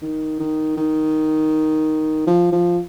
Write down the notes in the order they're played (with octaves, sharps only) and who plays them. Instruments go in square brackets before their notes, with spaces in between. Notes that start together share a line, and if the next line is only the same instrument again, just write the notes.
[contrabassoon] D#3
D#3
D#3
F3
F3